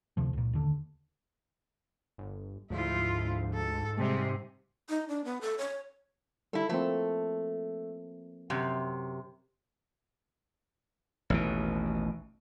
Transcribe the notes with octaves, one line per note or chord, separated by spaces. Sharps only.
D2 C3 F3
C#2 A#2
D#2 D3
G1
D2 G#2 F3 E4 F4
A4
C3 G3 G#3
D#4
D4
B3
A4
C#5
G3 E4 A4
F3 A3 A#3 C4
F#2 C3
A1 D#2 B2